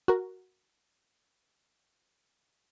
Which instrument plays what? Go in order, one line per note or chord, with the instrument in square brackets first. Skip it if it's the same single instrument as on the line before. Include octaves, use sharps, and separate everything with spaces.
[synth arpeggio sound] F#4 A#4